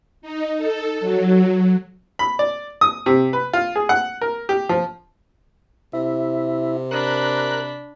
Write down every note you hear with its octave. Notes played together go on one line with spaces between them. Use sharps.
D#4
A4
F#3
B5
D5
D#6
C3
B4
F4
G#4
F#5
A#4
G4
F3
C3 E4
D4 A#4 B5 F#6